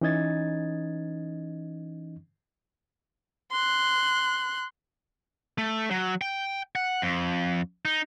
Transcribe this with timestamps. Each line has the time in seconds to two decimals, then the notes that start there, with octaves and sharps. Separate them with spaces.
0.01 E3 C#4 D#4 D#5 G#6 A6
3.52 C6 F#6
5.58 A3
5.91 F#3
6.21 G5
6.75 F#5
7.02 F2
7.85 D#4